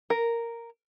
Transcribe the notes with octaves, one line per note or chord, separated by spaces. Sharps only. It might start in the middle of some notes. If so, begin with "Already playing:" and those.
A#4